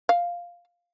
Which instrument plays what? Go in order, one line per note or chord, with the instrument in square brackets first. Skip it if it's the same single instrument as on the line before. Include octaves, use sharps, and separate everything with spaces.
[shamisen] F5